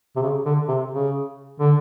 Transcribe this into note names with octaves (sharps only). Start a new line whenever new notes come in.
C3
C#3
D3
C3
C#3
D3